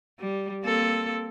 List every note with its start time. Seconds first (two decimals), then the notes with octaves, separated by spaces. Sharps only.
0.19 G3
0.64 A#3 C4 A4